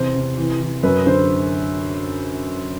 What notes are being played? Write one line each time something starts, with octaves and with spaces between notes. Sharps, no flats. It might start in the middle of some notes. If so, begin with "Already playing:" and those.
Already playing: E2 C3 C5
C3
E3
E3
F#2 B4
D3 C5